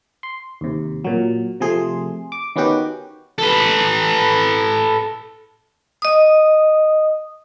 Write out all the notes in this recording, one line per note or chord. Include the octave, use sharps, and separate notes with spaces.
C6
D#2 C3
A#2 F#3
C3 F3 A3 G#4 C6
D6
D#3 B3 C#4 F#4 G4
A4 B4
D#5 D#6